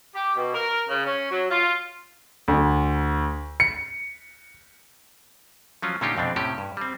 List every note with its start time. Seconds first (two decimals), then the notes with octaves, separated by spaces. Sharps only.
0.14 G4
0.35 B2
0.53 A#4
0.88 C#3
1.04 C#4
1.30 F#3
1.49 F4
2.48 D2
3.60 C#7
5.82 F3 F#3 C#4 F4
6.01 A#2 D3 C#4 D#4 F4 G4
6.17 F2 B2 C4 D4
6.36 A2 C3 C#4 G4
6.58 G2
6.77 G3 C4